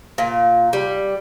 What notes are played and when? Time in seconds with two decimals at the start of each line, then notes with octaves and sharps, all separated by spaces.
0.18 A#2
0.73 G3